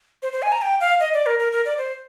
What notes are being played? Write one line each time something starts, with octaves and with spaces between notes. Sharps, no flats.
C5
C5
G#5
A#5
G5
F5
D#5
D5
A#4
A#4
A#4
D5
C5